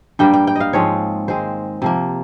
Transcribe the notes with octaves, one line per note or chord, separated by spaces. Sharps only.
G2 G3 A#3 G5
G5
G5
D#5 F5
G#2 F3 G#3 C4 C#5
D#3 G#3 C4 C5
C3 F3 A#3